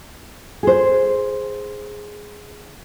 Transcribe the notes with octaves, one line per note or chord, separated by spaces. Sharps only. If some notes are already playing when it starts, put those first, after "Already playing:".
G#4 C5